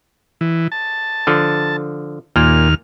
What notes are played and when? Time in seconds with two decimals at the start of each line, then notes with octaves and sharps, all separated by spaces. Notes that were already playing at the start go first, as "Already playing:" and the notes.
0.41 E3
0.72 A5
1.27 D3 F3
2.36 D#2 A#2 A#3 F6